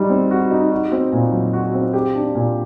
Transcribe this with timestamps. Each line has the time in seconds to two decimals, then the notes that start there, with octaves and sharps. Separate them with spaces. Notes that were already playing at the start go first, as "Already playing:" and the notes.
Already playing: G3 D#4 F#4
0.10 C4
0.31 F#4
0.51 D#4
0.72 F#4
0.92 C4
1.13 A#2
1.32 F#3
1.53 F#4
1.74 C4
1.93 G4
2.15 D4
2.35 A#2